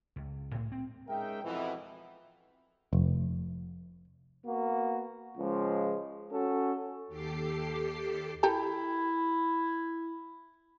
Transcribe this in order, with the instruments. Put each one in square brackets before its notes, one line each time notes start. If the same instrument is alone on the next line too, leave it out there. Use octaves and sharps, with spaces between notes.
[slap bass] C#2
A2
C4
[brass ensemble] G#3 C#4 D#4 A#4 E5 G5
F2 B2 E3
[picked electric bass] F1
[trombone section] A#3 B3 F#4
C#2 F3 G#3
C#4 F#4 A4
[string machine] D#2 G4 A4 D6 C7
[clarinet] E4 [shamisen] G4 A4 A#4